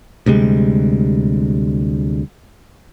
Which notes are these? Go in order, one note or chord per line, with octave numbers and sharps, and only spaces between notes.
D2 C3 G3 G#3